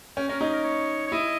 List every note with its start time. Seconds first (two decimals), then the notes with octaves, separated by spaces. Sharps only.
0.16 C#4 G5
0.29 C#4 A#4
0.40 D#4 G#4
0.53 A#4
0.64 C#5
1.08 C#5
1.12 E4 D#5